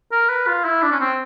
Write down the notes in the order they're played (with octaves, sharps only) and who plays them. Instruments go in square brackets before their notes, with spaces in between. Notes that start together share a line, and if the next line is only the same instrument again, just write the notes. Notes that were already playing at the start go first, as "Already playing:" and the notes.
[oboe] A#4
B4
F4
E4
D4
C#4
C4